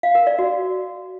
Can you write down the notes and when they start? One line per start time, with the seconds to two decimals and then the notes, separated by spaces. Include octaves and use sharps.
0.03 F5
0.15 A#4
0.27 D5
0.39 F#4